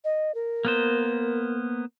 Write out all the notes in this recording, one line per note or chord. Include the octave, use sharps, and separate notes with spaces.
D#5
A#4
A#3 B3 C5